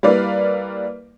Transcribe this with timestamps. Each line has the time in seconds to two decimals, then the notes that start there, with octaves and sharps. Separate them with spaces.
0.03 G3 A#3 E4 B4 D5 F5